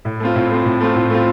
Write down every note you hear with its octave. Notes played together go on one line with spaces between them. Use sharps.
A2
A3 C4 F4
A2
A3 C4 F4
A2
A3 C4 F4
A2
A3 C4 F4